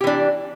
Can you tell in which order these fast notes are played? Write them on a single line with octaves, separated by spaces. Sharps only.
G4 E3 D4